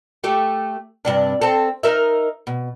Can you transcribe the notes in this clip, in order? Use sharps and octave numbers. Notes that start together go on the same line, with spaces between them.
A3 G4
G2 C3 D4
C4 A4
D#4 A#4 E5
B2